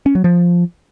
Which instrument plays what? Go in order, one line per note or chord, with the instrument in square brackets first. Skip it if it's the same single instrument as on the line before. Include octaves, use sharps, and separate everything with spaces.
[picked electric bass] C#4
F#3
F3